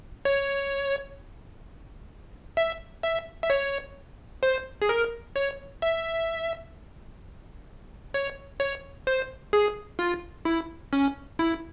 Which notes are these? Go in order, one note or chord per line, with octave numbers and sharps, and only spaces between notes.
C#5
E5
E5
E5
C#5
C5
G#4
A#4
C#5
E5
C#5
C#5
C5
G#4
F4
E4
C#4
E4